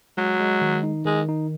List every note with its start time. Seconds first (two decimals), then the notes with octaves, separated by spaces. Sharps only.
0.17 F#3 G#3
0.40 G#3
0.61 D#3
0.83 D#4
1.05 D#3 G#3
1.29 D#4